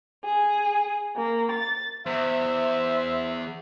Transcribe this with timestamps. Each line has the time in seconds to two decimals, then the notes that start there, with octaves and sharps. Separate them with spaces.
0.24 G#4
1.15 A#3
1.51 A6
2.06 E2 C5 E5